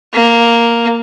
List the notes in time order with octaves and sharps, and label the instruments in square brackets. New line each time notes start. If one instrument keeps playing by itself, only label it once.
[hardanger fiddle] A#3